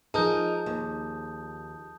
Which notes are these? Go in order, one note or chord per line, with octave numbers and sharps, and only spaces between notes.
F3 D#4 G#4 A#4 A5 D#6 G6
D#2